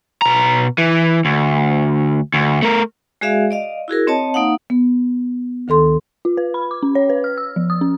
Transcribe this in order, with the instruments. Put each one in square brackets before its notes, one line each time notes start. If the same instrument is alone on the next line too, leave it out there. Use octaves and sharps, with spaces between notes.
[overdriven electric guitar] B2 A#5
E3
D2
D2
A3 A#4
[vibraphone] G#3 F#4 G#4 D5 E5 F5
D5 D#5 F5
E4 F#4 G#4 A#4
C4 C#5 D#5 A5
A#3 D#4 F5 F#5
[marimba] B3
D2 D#3 A4 C6
[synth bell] F4
B4
B5
D6
C#4
C#5
B4
F6
E6
F3
D#6
C#4